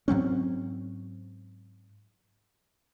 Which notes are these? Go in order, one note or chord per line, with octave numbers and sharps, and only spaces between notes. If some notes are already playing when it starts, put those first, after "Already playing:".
G#2 F#3 C4 C#4